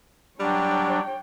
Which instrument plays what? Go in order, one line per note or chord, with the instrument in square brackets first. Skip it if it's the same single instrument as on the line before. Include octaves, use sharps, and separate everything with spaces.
[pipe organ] F#3 D4 [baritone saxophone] G3 [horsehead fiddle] C#5 G5